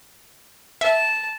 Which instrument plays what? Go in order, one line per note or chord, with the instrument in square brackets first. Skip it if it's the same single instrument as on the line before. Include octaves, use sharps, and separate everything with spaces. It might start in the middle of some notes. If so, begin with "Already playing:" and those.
[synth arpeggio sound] E5 [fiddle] A5